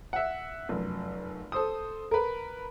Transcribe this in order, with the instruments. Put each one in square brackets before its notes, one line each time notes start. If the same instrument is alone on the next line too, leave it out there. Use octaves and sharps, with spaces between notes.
[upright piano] E5 F#5
F1 F#2
A4 C5 D#6
A#4 B4